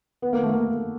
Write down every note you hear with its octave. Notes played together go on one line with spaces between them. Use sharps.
B3
A#3
A3
A#3